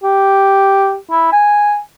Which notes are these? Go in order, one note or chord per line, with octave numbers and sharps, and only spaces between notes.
G4
E4
G#5